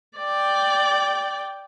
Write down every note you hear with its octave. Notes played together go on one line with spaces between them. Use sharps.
D5 G5